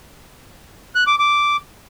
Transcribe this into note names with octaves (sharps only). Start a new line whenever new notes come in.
F#6
D6
D6